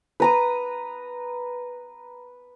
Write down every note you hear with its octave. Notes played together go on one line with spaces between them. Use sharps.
B4 A#5 D#6